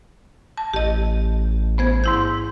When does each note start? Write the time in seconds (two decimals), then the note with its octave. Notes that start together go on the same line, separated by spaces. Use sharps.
0.57 A5
0.74 A1 G4 D#5
1.78 B3 C5 G#6
2.04 G#2 E4 G6